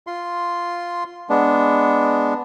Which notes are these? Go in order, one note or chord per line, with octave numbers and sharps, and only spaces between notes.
F4 C6
G#3 B3 D4